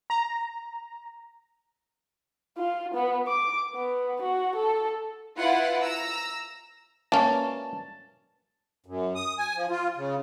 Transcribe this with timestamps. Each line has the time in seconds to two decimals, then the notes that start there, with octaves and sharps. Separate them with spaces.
0.10 A#5
2.57 F4
2.94 B3
3.28 D6
3.75 B3
4.22 F#4
4.55 A4
5.39 E4 F4 B4 F5 F#5
5.81 A#5 E6
7.12 A#3 C#4 A5
8.86 F#2
9.15 D#6
9.38 G#5
9.56 F3
9.70 F4
9.97 C#3